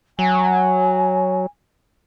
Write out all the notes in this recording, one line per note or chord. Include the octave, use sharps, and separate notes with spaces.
F#3 G#5